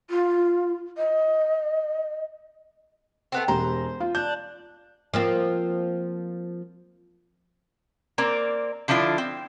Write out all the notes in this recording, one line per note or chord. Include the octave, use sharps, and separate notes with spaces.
F4
D#5
A3 B3 C4
E1 G4 C5 A#5
F4
D4 G6
F3 A#3 C4
A#3 C4 A#4 D5
D3 F3 D4 E4 F4 D5
C4